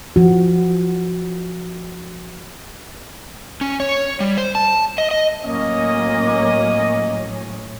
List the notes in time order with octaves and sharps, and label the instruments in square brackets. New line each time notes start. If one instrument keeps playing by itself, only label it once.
[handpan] F3 F#4
[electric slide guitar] C#4
C#5
G3
C5
A5
D#5
D#5
[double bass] A2 [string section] F#3 C#4 [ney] A#3 [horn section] D#5